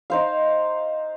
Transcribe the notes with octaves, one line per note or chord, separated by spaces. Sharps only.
D#4 C5 F5